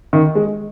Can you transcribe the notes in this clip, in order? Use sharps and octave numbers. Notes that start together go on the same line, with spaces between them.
D#3
G#3